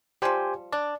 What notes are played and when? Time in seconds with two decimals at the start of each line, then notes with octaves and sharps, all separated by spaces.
0.22 F3 G3 G4 C5 G#5
0.73 D4 D5